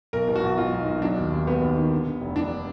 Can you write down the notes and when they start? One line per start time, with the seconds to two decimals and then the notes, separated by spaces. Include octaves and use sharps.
0.13 B1 A#4
0.28 B2
0.36 F#4
0.43 B1
0.58 B1 F4
0.73 B1
0.80 D#4
0.88 B1
0.98 D#4
1.02 F#3 D4
1.17 D#2
1.32 D#2
1.47 F#3 B3
1.62 D#2
1.77 D#3
1.91 D3
2.06 D3
2.21 F1
2.36 F1 D4